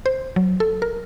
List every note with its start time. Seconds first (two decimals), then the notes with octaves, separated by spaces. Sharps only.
0.06 C5
0.36 F#3
0.60 A4
0.82 A#4